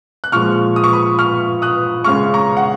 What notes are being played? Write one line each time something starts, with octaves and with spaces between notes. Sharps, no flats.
F#6
A#2 F3 G#3 C#6 F6
D#6
C#6
B5 D#6
C#6 F6
D#6 F#6
C#3 G#3 C#6 F6
A#5 C#6
F#5